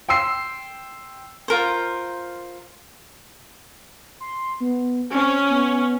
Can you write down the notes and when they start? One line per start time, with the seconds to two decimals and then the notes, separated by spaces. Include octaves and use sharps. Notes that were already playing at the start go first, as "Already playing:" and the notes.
0.09 G5 C6 E6 C7
1.48 F4 A#4 C5
4.20 C6
4.61 B3
5.13 C4 C#4
5.50 B3